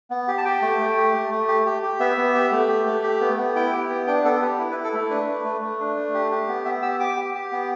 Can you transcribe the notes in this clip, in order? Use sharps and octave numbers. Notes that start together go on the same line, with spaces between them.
B3
G4
A5
G4 G5
A3
A3
G4
A3
A3
G4
G4
G4
B3 E5
B3
G4
A3
G4
A3
G4
B3
B3
E4 G5
G4
B3
D4 G5
B3 A4
G4 B4
E4
B4
E4
A4
A3
D4 B4
A3
A3
A3
D4
A3
G4
G4
B3
B3 E5
G4 E6
G4 D6
G4
G4
B3